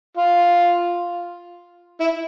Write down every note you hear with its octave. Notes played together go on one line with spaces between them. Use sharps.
F4
E4